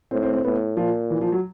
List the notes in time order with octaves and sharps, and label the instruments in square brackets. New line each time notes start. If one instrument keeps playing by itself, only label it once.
[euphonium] A2 [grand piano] C4
[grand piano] C4
C4
[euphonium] A2 [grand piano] B3
[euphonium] A#2 [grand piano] F3
[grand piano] E3
F3
F#3